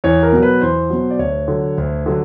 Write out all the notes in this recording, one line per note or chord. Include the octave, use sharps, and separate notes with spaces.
E2 C#5
A#4
B2 F#3
B4
E2 C5
B2 F#3
D5
D2 C#5
D3 F#3
D2
D3 F#3